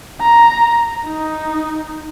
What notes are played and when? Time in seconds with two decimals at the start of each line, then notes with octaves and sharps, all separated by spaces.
0.21 A#5
1.07 D#4